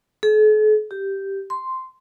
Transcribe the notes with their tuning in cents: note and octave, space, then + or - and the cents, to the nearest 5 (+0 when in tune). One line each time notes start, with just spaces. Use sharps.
A4 -45
G4 -5
C6 -5